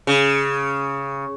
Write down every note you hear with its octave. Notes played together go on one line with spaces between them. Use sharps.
C#3